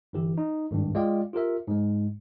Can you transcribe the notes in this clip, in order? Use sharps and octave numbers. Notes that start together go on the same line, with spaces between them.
G1 E3 G4
D#4
G#1 C#2 G2
G#3 F4 D5 F5 G5
F4 G4 A#4 E5
G#2 G#3